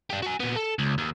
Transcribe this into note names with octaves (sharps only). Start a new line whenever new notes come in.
D4 G4
F#4 G#5
A#2 B3
A4
C#2
D#2